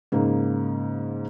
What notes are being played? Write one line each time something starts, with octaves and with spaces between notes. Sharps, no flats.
G#2 C#3 A#3